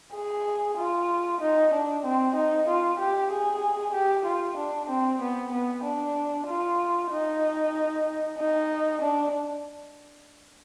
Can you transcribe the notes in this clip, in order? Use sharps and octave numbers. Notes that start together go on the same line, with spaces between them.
G#4
F4
D#4
D4
C4
D#4
F4
G4
G#4
G4
F4
D4
C4
B3
B3
D4
F4
D#4
D#4
D4